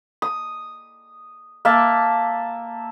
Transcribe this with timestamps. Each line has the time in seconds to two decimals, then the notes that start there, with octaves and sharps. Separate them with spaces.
0.22 D#6
1.65 A#3 E5 A5